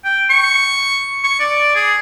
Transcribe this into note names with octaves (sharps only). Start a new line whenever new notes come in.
G5
C#6
C#6
D5
G#4